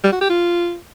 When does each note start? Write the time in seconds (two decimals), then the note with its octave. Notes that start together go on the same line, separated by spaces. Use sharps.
0.04 G3
0.12 F#4
0.21 G4
0.30 F4